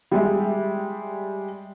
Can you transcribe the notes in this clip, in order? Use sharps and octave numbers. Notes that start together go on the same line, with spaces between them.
G3 G#3 E5